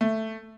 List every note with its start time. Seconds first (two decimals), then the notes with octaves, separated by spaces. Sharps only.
0.01 A3